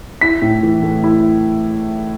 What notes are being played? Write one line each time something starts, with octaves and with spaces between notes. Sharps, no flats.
E4 B6
A2
E3
A3
E4